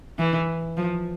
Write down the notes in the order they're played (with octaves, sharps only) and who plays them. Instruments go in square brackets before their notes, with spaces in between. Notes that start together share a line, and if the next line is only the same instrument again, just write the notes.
[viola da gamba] E3
F3